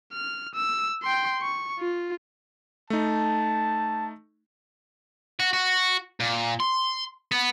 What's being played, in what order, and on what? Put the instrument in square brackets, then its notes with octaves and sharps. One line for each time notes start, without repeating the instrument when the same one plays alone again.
[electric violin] F6
E6
G5 C6
C#6
F4
[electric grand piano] A3 D#4 [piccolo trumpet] A5
[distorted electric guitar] F#4
F#4
A#2
C6
B3